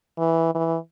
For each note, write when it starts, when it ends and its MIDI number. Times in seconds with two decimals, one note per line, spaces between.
0.18 0.54 52
0.54 0.76 52